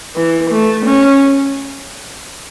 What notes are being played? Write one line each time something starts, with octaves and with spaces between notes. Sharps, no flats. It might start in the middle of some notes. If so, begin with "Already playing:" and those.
E3
A3
C#4